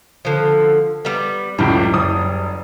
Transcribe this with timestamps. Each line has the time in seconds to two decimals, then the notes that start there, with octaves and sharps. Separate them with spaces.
0.25 D3 F3
1.05 G3 B3
1.59 C#2 F#2 A2 G3
1.93 F#1 D#6